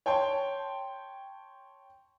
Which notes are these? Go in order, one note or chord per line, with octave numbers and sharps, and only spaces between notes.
C#5 G5 A5 C6